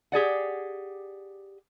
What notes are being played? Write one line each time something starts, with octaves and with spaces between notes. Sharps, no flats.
G4 G#4 D5 F#5